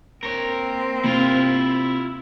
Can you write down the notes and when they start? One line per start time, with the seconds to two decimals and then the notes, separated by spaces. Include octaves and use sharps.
0.23 A#3 C4 A#4 C#5
1.04 C3 E4 F4